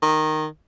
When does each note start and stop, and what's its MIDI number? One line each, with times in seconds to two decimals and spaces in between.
0.03 0.47 51